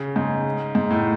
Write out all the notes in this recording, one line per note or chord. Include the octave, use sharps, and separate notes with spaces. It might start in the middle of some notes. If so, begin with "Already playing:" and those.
Already playing: C#3
G#2
G#2
A2